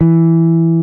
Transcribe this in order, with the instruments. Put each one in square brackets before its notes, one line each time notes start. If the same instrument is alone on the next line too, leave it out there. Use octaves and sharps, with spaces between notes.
[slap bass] E3